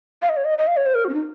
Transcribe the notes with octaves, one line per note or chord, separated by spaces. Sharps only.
F5
D#5
C#5
D#5
D#5
F5
C#5
C5
A#4
F#4
C#4
D#4